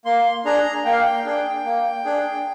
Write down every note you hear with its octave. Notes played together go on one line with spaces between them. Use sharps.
A#3 C6
D4 G#4 A#5
A#3 G5
F5
G5
D4 G#4
A#3
D4 G#4